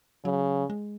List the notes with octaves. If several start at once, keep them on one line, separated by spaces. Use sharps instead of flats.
C#3 F#3
G#3